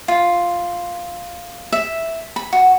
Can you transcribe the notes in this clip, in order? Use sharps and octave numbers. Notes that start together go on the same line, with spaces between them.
F4
E5
B5
F#4